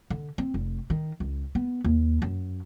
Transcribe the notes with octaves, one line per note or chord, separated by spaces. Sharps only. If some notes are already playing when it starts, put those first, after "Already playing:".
D3
C4
F1
D#3
C#2
B3
D#2
F#2